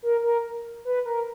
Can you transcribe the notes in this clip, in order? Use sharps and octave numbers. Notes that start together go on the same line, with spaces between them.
A#4
A#4
B4
A#4